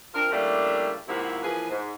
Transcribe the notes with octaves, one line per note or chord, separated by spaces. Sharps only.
C4 D4 F4 A#4
C#3 G3 A3 A#3 D4 E4
G#2 C3 F3 A#3 E4 F#4
E3 F3 A#3 G#4 B4
G#2